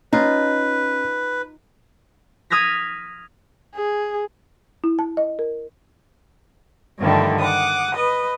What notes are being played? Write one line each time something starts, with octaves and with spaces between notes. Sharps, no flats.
C#4 D#4 F4 B4
D#6 F6 G#6 A#6 B6
G#4
E4
A5
D#5
A#4
G2 D3 D#3 F3 G3 A3
F#5 D6 D#6
B4 D#5